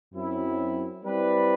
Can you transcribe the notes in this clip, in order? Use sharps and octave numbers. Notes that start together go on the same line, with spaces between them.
F#2 F#3 C4 E4
G3 C4 E4 B4 D5